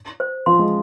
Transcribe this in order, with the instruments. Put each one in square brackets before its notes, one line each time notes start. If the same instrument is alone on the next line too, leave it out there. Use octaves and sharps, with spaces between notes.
[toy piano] C5
[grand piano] F3 [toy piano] C6
[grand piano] G#3